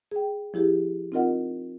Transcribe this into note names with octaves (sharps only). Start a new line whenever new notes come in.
G#4 G5
F3 E4 G4 G#4
C4 D#4 F4 A#4 D#5 F#5